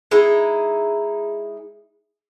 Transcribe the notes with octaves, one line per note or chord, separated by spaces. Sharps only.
G#3 D#4 E4